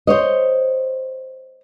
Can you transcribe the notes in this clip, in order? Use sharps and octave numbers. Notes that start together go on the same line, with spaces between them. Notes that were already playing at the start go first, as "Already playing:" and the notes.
C5 C#5 D#5